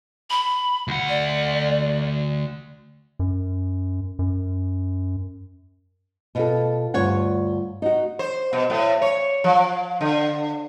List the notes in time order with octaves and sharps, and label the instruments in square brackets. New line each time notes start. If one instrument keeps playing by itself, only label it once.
[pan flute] B5
[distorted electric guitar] D2 F#5
[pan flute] D5
[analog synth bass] F#2
F#2
[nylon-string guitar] B2 F4 A4
D2 G2 F4 C#5 F#5
D#4 F#4
[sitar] C5
B2
A2
C#5
F3
D3